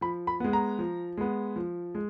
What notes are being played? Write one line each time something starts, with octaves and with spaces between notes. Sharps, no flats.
F3 B5
B5
G#3 B3
A#5
F3
G#3 B3
F3
G#3